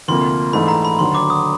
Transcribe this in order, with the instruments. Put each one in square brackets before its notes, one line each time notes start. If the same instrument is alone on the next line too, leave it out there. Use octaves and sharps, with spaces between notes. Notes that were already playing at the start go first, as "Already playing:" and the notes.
[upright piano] D2 C3 F3 A#3 [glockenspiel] C6
[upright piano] A#1 G#2 E3 A3 [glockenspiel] B5
[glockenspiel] A#5
B5
[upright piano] E1 D#2 D3 F#3 [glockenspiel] C6
[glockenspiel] D6
D#6